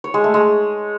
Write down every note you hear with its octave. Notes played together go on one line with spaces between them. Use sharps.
C#5
G#3
A3
G#3